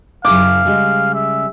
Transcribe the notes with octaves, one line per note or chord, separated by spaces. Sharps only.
F#2 C#3 E4 F5 D6
C#3 G3 G#3
E5